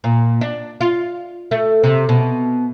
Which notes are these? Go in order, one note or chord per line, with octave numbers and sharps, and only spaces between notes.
A#2
D4
F4
A3
C3
B2